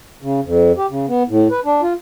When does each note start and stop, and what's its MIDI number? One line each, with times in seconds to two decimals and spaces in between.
0.22 0.40 49
0.44 0.72 41
0.77 0.87 67
0.90 1.06 49
1.08 1.23 59
1.29 1.48 45
1.51 1.60 71
1.65 1.81 62
1.82 1.93 65